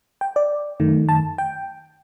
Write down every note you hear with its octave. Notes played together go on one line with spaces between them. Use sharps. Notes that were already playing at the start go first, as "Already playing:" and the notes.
G5
D5
F#2 D#3 A3
A5
G5